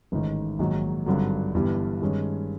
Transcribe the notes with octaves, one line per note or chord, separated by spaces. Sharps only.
A1 G#2 D#3
A#1 G#2 D#3 F#3
G#1 G2 D3 F#3
G1 G2 E3 G3
G2 D#3 G#3 C#4